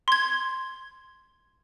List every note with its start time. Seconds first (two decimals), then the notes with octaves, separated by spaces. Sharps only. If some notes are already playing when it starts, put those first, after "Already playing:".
0.08 C6 G#6